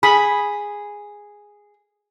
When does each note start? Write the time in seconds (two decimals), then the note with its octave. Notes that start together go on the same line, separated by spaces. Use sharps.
0.03 G#4 B5